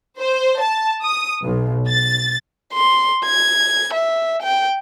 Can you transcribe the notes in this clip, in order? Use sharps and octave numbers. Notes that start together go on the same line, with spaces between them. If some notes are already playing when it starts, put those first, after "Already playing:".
C5
A5
D#6
B1
A6
C6
G#6
E5
G5